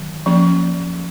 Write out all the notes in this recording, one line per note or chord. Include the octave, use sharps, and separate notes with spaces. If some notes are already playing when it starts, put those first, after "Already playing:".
Already playing: D#3 F#3
F3 A#3 C#4